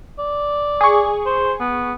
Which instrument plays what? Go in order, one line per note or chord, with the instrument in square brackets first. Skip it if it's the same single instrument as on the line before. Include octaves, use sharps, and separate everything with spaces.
[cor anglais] D5
[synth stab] G#4 C#6
[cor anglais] C5
B3